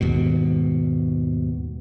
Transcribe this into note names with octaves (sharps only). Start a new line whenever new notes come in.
D#2 G#2 B2